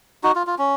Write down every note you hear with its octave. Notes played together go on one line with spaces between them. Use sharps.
D#4 F#4
F4
F4
C#4